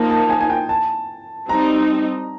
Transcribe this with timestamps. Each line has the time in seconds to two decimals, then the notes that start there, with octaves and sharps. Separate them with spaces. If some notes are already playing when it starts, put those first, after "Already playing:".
Already playing: F3 A#3 D#4 A5
0.10 A5
0.30 G#5
0.40 G#5
0.50 G5
0.69 A5
1.49 G3 C4 D#4 A#5